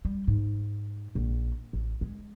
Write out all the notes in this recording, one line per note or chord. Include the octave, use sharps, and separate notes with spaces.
G3
G#2
A#1
A1
G#3